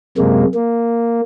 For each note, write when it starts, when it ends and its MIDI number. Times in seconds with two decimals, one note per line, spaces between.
0.18 0.44 42
0.18 0.44 48
0.18 0.44 56
0.18 0.44 58
0.54 1.21 58